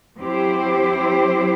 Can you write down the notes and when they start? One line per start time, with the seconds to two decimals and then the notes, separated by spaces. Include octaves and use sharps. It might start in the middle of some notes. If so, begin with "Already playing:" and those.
0.17 F#3 C4 E4 G4 C5